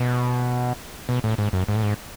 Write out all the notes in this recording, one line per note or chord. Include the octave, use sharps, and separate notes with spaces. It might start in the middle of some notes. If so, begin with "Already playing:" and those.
Already playing: B2
B2
A2
G#2
F#2
G#2
A2
G#2